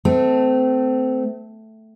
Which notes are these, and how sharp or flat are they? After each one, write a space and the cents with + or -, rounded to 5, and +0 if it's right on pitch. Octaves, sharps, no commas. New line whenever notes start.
A3 +0 C4 -30